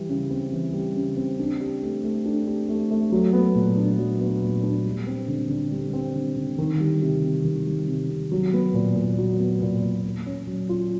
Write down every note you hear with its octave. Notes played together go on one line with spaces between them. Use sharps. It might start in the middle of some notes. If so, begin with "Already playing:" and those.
Already playing: E3 G3
C#3
C4
E3
G3
C#3
C4
D4
G4
A3
A3
D4
G4
A3
A3
F#3
B3
A#2
D4
F#3
B3
A#2
D4
G3
C4
D3
D3
G3
C4
D3
D3
D#3
G3
C3
C3
D#3
G3
C3
C3
F#3
B3
A#2
A#2
F#3
B3
A#2
A#2
A#3
C#4
F#3
F4